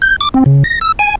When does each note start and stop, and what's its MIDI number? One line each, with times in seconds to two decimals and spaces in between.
0.02 0.16 91
0.21 0.29 86
0.34 0.44 60
0.46 0.63 49
0.64 0.79 94
0.81 0.92 88
0.99 1.15 80